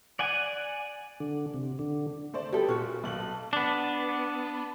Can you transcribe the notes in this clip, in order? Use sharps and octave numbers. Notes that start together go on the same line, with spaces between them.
D5 F#5 G#5
D3
C3
D3
A3 C5 D5
G3 B3 E4 G4 A4
A#2 C#4 F#4
B1 A4 F#7
B3 D4